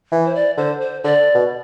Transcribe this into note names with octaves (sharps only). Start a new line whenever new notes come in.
E3
C5
D5
D3 C5
C5
D3 D5
B2